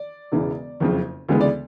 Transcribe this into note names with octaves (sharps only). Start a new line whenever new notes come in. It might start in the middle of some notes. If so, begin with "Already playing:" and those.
Already playing: D5
E1 E2 C#3 E3
F#1 F2 C#3
D2 C#3 E3 G#3 B3
D5